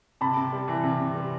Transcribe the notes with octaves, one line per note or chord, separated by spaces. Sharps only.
C3 A5 B5
C3
G3
E3
C3
C3
G3